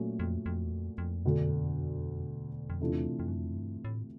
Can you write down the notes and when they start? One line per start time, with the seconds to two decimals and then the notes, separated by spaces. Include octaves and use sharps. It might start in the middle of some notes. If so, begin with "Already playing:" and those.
Already playing: A#2 F#3 A3 C#4 F#4
0.19 F2
0.46 F2
0.65 E2
0.72 F2
0.98 F2
1.24 E1 D2 D3
2.70 F2
2.80 E2 C3 E3 A3 D4 F4
3.19 F2
3.28 F#2
3.37 F2
3.53 F#2
3.59 G2
3.85 A2